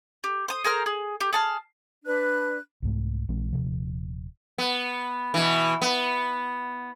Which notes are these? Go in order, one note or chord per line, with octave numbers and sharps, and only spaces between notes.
G4
C5 D#6
G#4 A#4 C5 F6
G#4
G4
G#4 A5 F6
D4 B4 F#6
C2 G#2 A3
A#1 E3 G#3 C4
D#1 C#2 C3 F3
B3
B2 E3
B3